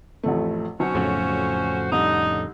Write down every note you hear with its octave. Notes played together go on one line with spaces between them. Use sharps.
A1 F2 A3
B1 C#4 F#4 C5
F2 A2 C#3
C2 D3 D#4